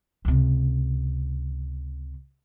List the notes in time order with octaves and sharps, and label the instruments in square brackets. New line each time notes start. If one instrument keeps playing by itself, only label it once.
[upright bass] C#2 C3